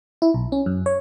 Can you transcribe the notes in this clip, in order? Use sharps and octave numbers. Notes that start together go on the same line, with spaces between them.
E4
B1
C#4
F#2
C#5